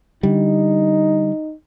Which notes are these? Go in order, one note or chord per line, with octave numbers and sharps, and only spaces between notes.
D3 G3 D#4